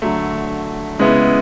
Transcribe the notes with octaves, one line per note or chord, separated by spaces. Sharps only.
D3 F#3 A3
C#3 G#3 B3 E4